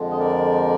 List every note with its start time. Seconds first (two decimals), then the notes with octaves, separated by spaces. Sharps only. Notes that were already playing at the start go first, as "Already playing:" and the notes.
Already playing: F2 D3 F3 G#3
0.11 D#5
0.19 A#4 D5